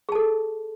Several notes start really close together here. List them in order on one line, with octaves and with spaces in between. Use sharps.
G#4 A5 A4